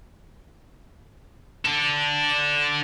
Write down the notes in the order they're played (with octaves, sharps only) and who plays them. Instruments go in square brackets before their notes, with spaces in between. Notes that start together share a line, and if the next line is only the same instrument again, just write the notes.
[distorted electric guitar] D4 A4